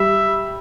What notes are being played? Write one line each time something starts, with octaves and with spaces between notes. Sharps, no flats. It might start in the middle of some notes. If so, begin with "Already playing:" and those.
Already playing: G3 E5